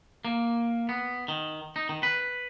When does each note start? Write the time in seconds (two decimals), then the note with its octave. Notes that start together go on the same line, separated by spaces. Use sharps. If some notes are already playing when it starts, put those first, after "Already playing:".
0.25 A#3
0.89 B3
1.28 D#3
1.76 D#4
1.89 D#3
2.03 B4